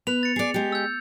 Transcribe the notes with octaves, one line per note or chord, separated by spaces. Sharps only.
B3 B4 F7
A6 C#7
G#4 D5
G#3 G4
E6 G6